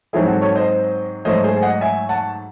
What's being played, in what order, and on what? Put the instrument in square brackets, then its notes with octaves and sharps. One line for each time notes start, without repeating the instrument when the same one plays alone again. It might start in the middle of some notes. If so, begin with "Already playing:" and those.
[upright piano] G#2 F#3 C4 D#4 E4 G#4
F#4 A4
A4 C#5
C5 D#5
G#2 F#3 A3 C5 D#5
G#4 C5
G#5
D#5 F#5
E5 G#5
F#5 A5